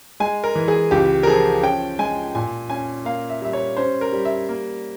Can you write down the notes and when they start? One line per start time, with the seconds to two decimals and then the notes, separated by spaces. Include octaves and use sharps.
0.20 G#3 G#5
0.44 A#4
0.56 E3
0.68 G#4
0.91 C#2 G4
1.23 A#4
1.27 F3 G#4
1.62 C#4 G5
1.99 G#3 G#5
2.35 A#2 G#5
2.70 C#4 G#5
3.05 A#3 F5
3.30 E5
3.42 G3 E5
3.53 C#5
3.77 C#4 C5
4.01 A#4
4.13 G3
4.25 E5
4.49 A#3